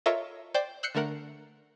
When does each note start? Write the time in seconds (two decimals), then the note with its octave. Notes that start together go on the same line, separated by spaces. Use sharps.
0.06 F4 A4 A#4 C#5 D#5 E5
0.54 C5 D5 G5 C6 D6
0.83 E6 F#6 G6 C7 C#7
0.95 D3 A3 A#4 F#5